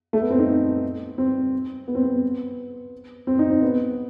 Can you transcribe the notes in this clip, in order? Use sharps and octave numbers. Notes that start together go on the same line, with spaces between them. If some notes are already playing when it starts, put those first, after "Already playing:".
A3
B3
C4
D#4
C4
B3
C4
B3
C4
D#4
C4
B3